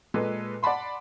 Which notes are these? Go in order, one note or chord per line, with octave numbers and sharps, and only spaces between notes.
A#2 G#3 A4 B4
D5 F#5 A5 B5 C6